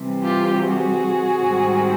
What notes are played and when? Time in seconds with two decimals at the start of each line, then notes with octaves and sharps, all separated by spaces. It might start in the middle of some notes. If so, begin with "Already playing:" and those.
Already playing: C3 E3 G3 C4
0.23 F4 G4
0.62 F#4 G#4
1.40 G#2 D#3 G3 C4